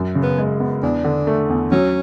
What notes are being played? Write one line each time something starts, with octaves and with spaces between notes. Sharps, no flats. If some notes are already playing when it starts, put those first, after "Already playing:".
Already playing: F#2
C#3
B3
G#3
B3
E2 D4
D3
A3
E2
F#3 C#4